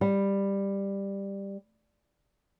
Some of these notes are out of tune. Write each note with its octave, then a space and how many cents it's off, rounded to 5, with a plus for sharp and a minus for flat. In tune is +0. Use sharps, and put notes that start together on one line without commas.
G3 +10